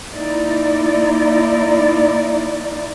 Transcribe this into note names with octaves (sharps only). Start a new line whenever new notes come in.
A#3 D#4 E4 D5